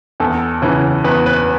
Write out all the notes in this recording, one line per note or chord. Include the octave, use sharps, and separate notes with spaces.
E2 A4
C#3 E3
E2 B4
B4